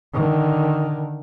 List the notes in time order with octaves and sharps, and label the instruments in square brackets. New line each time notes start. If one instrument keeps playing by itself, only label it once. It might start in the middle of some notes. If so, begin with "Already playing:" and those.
[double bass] D3 D#3